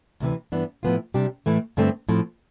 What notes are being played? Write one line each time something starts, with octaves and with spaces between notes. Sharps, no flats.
D2 C3 E3
G2 E3 B3 D4
A2 F3 B3 F4
C3 G3 D4 G4
A2 E3 A3
G2 D3 A3 C4
A2 F3 C4